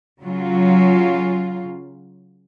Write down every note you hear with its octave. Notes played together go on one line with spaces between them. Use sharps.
C#3 F#3 F4